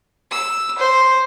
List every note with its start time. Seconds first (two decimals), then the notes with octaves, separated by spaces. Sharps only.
0.31 E6
0.79 C5